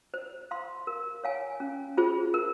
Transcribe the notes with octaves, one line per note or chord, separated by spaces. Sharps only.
C5
F5 C6
A#4
C#5 F5 G#5
C#4
F4 G#4 C5
A#4